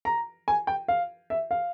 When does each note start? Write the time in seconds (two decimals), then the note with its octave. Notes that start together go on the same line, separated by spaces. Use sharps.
0.05 A#5
0.48 G#5
0.67 G5
0.88 F5
1.30 E5
1.51 F5